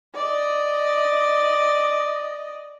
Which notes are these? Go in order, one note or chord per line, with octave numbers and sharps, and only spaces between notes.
D5 D#5